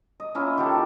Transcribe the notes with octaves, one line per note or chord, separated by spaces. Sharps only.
D#5
A#3 C#4 E4 F4
D#3 G4 A4